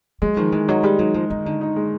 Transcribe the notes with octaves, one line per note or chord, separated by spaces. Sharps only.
F#3 G#3
D#3 F3
E3 G#3
F#3 D#4
G3 G#3
F#3 D#4
F3 G#3
D#3 D#4
D3 D#4
D#4
G#3